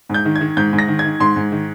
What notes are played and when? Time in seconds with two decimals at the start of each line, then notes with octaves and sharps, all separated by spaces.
0.09 G#2 G6
0.25 D#3
0.36 G#6
0.41 D#3
0.57 G#2 G6
0.73 G#2
0.79 A#6
0.88 D#3
0.99 G#6
1.05 D#3
1.20 G#2 C6
1.36 G#2
1.52 D#3